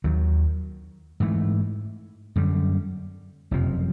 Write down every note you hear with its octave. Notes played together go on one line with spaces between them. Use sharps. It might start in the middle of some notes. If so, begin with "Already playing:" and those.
D#2 D#3 F#3
G#2 E3 A3
F#2 D3 G3
F#1 F2 C3 F3